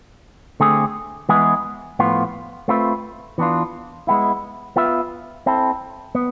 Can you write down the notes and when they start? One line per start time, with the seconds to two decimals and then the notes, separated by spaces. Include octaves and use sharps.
0.60 D3 A3 C4 G#4
1.29 E3 G#3 B3 E4 G#4
1.99 A2 F3 B3 F4
2.68 A3 C4 F4 B4 E5
3.38 E3 B3 D4 F4
4.07 G#3 B3 E4
4.76 B3 F4 B4 E5
5.46 C4 E4 A4
6.15 B3